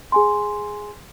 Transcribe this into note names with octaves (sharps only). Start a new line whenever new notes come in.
G#4 G#5 C6